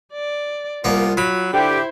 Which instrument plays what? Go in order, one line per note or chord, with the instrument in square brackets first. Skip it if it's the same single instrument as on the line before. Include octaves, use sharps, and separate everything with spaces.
[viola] D5
[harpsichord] C2 B3 [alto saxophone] A#3 [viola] F4
[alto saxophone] F#3 [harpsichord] B5
[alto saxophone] D3 [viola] E4 C5 [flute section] G4